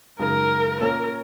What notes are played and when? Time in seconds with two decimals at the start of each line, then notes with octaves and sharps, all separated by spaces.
0.19 F#2 C#3 G#3 D#4 A#4
0.80 A#2 A#3 C#4 A#4